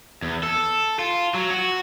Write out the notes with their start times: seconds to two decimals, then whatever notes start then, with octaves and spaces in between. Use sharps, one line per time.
0.22 E2
0.43 A4
0.99 F4
1.34 F#3
1.51 F#4